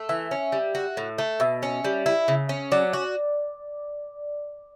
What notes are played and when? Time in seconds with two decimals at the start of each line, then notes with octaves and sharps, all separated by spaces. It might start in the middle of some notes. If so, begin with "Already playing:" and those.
Already playing: A3
0.09 E3 E5
0.31 C#4
0.52 G3
0.75 F#4
0.97 A2
1.18 A3
1.40 B2 E5
1.63 C#4
1.84 G3
2.06 E4
2.28 C#3
2.49 C#4
2.72 F#3 D5
2.93 F#4